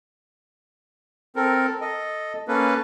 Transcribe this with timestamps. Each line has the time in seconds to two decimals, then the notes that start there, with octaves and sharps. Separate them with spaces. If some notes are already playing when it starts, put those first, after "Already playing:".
1.36 C4 A4 A#4
1.81 A4 D#5
2.48 A#3 C#4 A4 B4